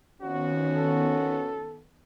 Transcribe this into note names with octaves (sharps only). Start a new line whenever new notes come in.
A1 F2 D#3 B3 C#4 F#4
A4